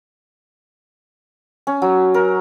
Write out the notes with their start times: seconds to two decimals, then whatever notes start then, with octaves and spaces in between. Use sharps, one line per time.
1.67 C#4
1.82 F#3
2.14 A#4